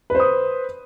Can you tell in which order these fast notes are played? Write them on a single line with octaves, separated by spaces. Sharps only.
B4 C5 D#6